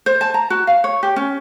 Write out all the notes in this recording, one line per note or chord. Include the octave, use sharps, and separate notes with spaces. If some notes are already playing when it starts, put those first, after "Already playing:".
C5
A5
A#5
F#4
F5
C#5
G4
C#4